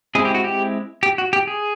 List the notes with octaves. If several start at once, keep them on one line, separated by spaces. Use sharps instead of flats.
G#3 C4 E4 G#4
G4
F#4
G4
G4
F#4
G4
G#4